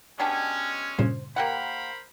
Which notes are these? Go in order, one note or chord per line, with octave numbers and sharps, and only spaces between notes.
B2 G#3 C#4 D4 G4
G2 A#2 C#3 C5
A#3 G4 A#4 C5 F#5 B5